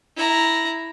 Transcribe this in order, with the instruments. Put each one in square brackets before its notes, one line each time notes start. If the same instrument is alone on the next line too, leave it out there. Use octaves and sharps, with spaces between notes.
[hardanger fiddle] E4 A#5